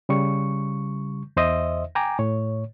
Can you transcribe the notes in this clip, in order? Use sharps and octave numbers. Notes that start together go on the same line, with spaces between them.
C#3 G3 C#6
E2 C5 D#5 E5
G5 G#5 A#5 D6
A2 C#5